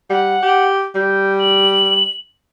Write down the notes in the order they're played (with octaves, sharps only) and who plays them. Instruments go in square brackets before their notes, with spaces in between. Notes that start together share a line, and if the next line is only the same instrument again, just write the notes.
[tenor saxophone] G3 [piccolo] F#5
[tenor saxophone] G4
[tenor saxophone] G3 [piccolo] G6
[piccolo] F#7